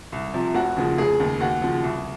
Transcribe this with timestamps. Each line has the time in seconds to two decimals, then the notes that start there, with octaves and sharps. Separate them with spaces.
0.12 C2
0.34 C3 F3
0.55 F1 F#4
0.76 D#2 C#3 F3
0.98 F1 G#4
1.20 D#2 C#3
1.40 D#2 F#4
1.62 C#3 F3
1.83 C2